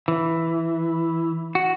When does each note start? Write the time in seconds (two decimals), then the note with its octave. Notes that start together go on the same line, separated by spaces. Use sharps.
0.08 E3
1.55 F#4